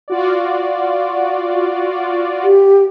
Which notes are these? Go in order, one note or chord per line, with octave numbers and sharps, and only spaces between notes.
F4 F#4 D5
G4